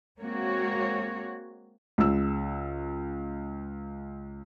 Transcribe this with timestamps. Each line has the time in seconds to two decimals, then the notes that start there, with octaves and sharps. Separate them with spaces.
0.19 G#3 A#3 C4 F#4 C#5
1.98 C#2 E6